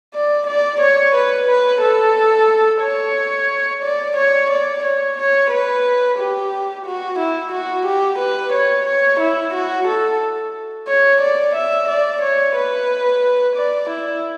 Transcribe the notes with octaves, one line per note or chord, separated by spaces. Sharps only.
D5
D5
C#5
B4
B4
A4
C#5
D5
C#5
D5
C#5
C#5
B4
G4
F#4
E4
F#4
G4
B4
C#5
C#5
E4
F#4
A4
C#5
D5
E5
D5
C#5
B4
D5
E4